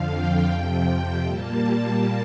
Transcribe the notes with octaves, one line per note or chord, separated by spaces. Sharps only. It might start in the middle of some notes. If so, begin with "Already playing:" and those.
Already playing: F2 D3 F3 F5
G5
F2 C3 F3 G5
G5
A#2 G3 A#3 A5